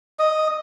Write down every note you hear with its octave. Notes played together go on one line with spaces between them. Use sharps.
D#5